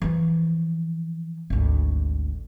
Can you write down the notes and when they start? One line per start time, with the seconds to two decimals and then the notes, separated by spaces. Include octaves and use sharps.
0.02 E3 F3
1.50 G#1 D2